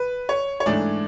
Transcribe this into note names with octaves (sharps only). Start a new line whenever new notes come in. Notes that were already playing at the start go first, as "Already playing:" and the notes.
Already playing: B4
C#5
C#5
G#2 E3 A3 D4 D5